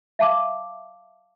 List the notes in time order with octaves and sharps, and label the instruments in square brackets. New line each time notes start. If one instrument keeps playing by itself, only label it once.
[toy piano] E5 F5 A5 D6